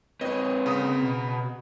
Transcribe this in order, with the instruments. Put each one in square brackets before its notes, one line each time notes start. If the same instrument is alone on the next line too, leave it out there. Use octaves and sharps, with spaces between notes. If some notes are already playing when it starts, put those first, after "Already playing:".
[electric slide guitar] C4 B4 C#5 [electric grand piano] D#5
[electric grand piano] C#3 A#5 D#6
[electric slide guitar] B2